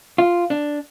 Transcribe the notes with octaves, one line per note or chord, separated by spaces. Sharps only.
F4
D4